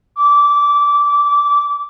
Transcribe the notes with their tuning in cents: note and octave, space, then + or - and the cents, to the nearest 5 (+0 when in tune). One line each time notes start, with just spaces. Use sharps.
D6 -20